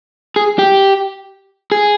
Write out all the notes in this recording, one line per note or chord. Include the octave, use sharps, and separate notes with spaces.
G#4
G4
G#4